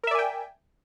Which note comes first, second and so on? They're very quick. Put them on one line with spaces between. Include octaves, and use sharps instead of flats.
A#4 E5 D5 G#5 G5